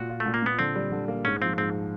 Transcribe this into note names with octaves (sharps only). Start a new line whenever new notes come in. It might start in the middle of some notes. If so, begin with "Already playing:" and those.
Already playing: A#2 F#4
F4
A3
A#2
A#3
A#2 B3
D3 C4
G3
D3
A#3
G#2 C#4
F3 C4
G#2 C4